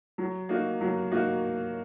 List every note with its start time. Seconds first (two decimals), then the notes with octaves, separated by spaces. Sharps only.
0.18 F#3
0.49 A#3 D#4 F#4
0.81 F#3
1.12 A#3 D#4 F#4